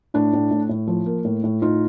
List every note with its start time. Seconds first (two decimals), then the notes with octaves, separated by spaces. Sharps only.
0.14 A2 D4
0.33 A2
0.51 A2
0.69 A2
0.87 F3
1.06 A#3
1.25 A2
1.44 A2
1.62 A2 D#4 F4